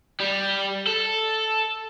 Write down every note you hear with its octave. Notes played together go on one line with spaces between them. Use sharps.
G3
A4